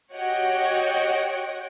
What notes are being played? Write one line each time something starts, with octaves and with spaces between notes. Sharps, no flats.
F#4 G4 C#5 D#5 F#5 G5